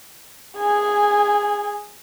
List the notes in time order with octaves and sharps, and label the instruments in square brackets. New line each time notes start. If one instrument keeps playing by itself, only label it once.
[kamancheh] G#4 G#5